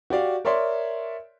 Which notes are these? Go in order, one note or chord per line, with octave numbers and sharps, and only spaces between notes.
F#4 G4 D5 F5
A#4 C#5 D5 E5 C6